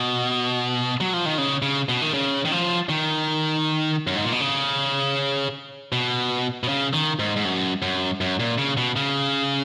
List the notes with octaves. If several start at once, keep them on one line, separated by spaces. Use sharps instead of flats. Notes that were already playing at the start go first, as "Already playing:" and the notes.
Already playing: B2
F#3
F3
D#3
C#3
C#3
B2
D#3
C#3
D#3
F3
D#3
F#2
G#2
A#2
B2
C#3
B2
B2
C#3
D#3
G#2
G#2
F#2
F#2
F#2
A#2
C#3
B2
C#3